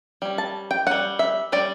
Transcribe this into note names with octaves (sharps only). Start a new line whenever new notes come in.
G3 C#4
A5
G5
G3 C#4 F#5
E5
G3 C#4 D5